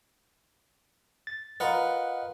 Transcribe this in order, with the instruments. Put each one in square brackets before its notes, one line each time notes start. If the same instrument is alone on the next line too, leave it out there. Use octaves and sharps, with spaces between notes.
[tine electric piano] A6
[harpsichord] F4 A#4 B4 [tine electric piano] D#5 F#5